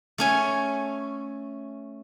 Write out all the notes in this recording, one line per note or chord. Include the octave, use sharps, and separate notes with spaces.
A3 C#4 G#5